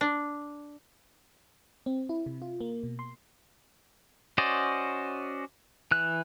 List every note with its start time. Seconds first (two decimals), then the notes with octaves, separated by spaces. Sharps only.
0.01 D4
1.86 C4
2.09 E4
2.26 C3
2.42 F4
2.61 A#3
2.83 B2
2.99 C6
4.38 C#4 F#4 C5 D5 D#5
5.91 E3 F#6